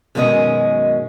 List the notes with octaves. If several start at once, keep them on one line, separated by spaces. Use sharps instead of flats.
F#2 B2 D#3 G#3 C#4 D#5